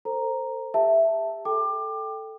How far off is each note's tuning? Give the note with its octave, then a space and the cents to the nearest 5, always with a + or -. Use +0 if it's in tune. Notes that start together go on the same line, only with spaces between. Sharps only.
A4 +35 C5 +0 A#5 +0
G4 +45 E5 +0 A5 +5
A4 +0 G5 +0 D6 +25